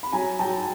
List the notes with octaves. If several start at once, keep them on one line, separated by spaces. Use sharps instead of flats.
B5
F#3 G#5 A#5
F#3 G5 A5